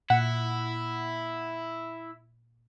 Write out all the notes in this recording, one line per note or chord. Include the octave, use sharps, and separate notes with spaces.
A#2 E4 F#5